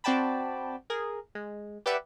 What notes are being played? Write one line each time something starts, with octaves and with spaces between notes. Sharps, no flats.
C4 F#4 D5 G5 A5 B5
G#4 A#4
G#3
G4 B4 D5 E5 F#5